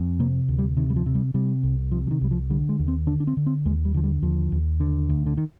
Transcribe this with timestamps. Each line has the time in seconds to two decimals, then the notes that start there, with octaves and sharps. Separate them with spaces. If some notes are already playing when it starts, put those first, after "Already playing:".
Already playing: F2
0.19 C3 A#3
0.48 D2
0.58 G3
0.77 C3 D#3
0.90 G3
0.96 F3
1.06 C3
1.15 G3
1.34 C3 G3
1.63 C2
1.92 C3 F3
2.07 F3
2.11 D#3
2.21 C2 G3
2.31 F3
2.50 D3 G3
2.69 G#3
2.79 D#2
2.88 C4
3.07 D3 D4
3.20 D4
3.27 C4
3.37 D3
3.46 C4
3.65 D#2 G#3
3.85 G3
3.94 D3 F3
4.04 G3
4.22 D#2 F3
4.52 D#2
4.80 D3
5.09 D2
5.26 D3
5.37 D#3